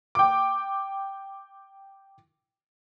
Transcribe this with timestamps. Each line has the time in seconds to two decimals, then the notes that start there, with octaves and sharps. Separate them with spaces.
0.15 G5 D6